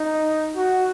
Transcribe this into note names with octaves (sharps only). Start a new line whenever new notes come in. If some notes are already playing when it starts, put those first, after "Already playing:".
Already playing: D#4
F#4